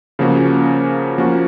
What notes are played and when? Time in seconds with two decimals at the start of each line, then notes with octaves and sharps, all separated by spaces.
0.19 C#3 F3 A#3 C#4 F#4
1.18 F3 A#3 C#4 F#4